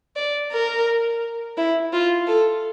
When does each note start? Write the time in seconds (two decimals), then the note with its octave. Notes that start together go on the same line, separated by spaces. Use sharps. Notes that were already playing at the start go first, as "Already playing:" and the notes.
0.16 D5
0.52 A#4
1.58 E4
1.93 F4
2.28 A4